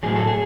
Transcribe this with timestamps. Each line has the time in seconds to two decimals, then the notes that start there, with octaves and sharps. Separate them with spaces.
0.03 A2 F#3 G#4
0.16 A4
0.27 G#4